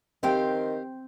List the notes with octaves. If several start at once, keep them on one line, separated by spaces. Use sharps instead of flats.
D#3 C4 G4 C5 F5 G5